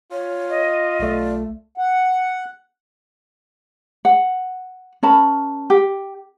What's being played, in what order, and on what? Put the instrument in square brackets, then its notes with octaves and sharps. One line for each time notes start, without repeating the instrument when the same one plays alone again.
[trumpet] F4 [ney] C#5
[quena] D#5
[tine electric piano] B1 A3 [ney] D5
[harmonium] F#5
[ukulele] F#5
C#4 A#4 A5 B5
G4